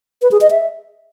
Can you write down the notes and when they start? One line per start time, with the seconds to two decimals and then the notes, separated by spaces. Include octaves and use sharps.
0.22 B4
0.32 G#4
0.41 D#5
0.51 E5